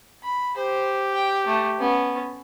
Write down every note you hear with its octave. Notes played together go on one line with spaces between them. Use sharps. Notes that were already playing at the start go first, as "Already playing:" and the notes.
B5
G4 C5
G5
A3
B3 C#4